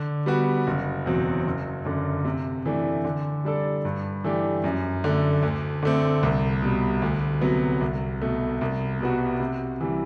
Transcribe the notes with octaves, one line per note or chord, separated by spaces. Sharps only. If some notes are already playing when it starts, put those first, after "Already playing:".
Already playing: D3
G3 B3 F#4
F#1
E2 B2 F#3 C4
F#1
F#2 D3
C3
E3 A3 D4
D3
G3 D4 A4
G2
E3 A3 D4 G4
F#2
D3 A3
D2
D3 A3 C4
C2
B2 G3
D2
C3 F#3 B3
C2
B2 A3
C2
B2 G3 B3 F#4
C3
E3 G3